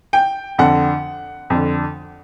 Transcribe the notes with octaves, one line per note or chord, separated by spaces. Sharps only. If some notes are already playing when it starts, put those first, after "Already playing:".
G5
F2 D3 F#5
F2 D3